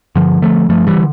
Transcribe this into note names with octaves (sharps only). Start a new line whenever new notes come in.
G2 D3 F3
D3 F3 A3
G2 F3 A3
E3 G3
D3